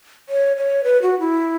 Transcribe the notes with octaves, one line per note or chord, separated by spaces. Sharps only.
C#5
C#5
B4
F#4
E4